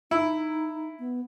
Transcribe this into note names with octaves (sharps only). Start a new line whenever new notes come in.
D#4 E4
B3